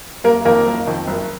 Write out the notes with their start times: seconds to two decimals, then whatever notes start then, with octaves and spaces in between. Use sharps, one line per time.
0.24 F#1 A#3 A#4
0.45 F2 D#3 A#3 A#4
0.66 F#1
0.87 F2 D#3
1.07 F#1